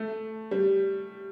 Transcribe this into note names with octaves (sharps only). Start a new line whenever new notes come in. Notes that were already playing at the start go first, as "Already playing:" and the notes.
Already playing: A3
G3